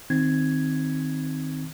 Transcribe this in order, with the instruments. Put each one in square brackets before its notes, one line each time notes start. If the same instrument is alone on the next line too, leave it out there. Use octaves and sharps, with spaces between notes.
[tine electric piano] D#3 C4 D#4 G#6